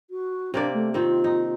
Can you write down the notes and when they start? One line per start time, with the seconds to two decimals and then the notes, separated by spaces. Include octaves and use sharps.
0.10 F#4
0.54 C3 A#3 D4 D5
0.73 A3
0.94 D#3 C4 F4
1.24 D#4